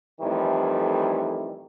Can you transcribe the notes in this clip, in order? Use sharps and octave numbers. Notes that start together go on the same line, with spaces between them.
F2 A2 D#3 E3 G3